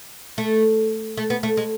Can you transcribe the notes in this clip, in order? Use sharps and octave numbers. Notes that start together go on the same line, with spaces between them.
A3
A3
B3
A3
G#3